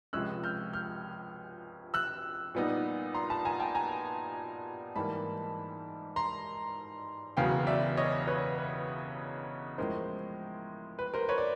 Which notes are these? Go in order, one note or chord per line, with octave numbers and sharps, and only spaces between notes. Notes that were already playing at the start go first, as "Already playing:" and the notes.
C#2 C3 F3 G#3 C#4 E6 F#6
F6 G6
F6 G6
E6 F#6
A#2 G3 B3 D#4
A#5 C6
A5 B5
G#5 A#5
G5 A5
G#5 A#5
G#2 E3 G3 A#3 A5 B5
A#5 C6
E1 E2 C#3 F#3 B3 F5 G5
D5 E5
C#5 D#5
B4 C#5
B4
A2 F3 G#3 C#4 A#4 C5
B4
A#4 C5
B4 C#5
D5